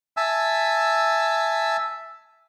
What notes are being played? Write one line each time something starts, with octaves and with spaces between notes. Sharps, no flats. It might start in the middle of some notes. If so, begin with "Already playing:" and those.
E5 G#5 A5 E6